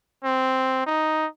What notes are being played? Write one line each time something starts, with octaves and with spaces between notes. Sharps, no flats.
C4
D#4